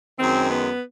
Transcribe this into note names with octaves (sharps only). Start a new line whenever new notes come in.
F#2 D#3 G#3 C4
B3